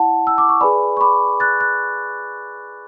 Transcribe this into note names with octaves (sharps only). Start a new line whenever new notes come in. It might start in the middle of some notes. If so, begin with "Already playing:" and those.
Already playing: E4 F#5 A5
E6
D6
C#6
G#4 B4 D5 G#5 B5
C#6
B5 D6
F#6 A6
F#6 A6